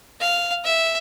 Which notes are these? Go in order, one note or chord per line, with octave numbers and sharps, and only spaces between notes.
F5
E5